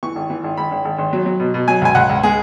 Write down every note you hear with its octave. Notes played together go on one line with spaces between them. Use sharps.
E3 C#6
G#1
E3
G#1
G#1 B5
G#1
G#1
G#1
F#3
F#3
B2
B2
F#3 G#5
C#2 G#5
C#2 F#5
C#2
G#3 G#4